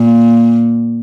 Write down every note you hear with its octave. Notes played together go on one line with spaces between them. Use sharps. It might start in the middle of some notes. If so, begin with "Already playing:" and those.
Already playing: A#2